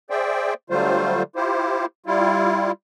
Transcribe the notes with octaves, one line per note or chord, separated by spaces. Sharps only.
G#4 C5 D5 E5 G5
D3 F#3 G3 A3 F4 C5
E4 F4 G4 C5
G3 E4 F4